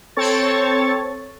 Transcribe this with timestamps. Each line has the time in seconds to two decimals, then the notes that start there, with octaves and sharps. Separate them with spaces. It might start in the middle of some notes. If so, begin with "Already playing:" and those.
0.17 C4 A4 C#5 C#6 A6